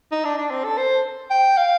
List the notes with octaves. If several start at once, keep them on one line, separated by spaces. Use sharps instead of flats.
D#4
D4
D4
C4
A4
C5
G5
F5